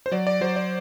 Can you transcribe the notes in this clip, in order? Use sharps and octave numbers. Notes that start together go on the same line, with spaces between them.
C5
F#3 D5
D5
F#3 C5
D5